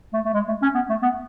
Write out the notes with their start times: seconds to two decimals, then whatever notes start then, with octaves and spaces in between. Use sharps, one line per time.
0.13 A3
0.25 A3
0.34 G#3
0.48 A3
0.62 C#4
0.74 B3
0.89 A3
1.02 B3